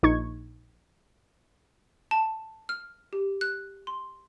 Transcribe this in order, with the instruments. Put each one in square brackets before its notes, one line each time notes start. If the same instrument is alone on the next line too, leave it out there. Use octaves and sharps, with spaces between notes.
[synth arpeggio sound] A#1 D#4 C#6 G#6
[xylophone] A5
F6
G4
F#6
C6